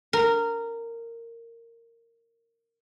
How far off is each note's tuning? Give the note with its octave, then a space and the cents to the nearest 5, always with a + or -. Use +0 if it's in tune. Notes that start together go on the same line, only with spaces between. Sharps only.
A#4 -15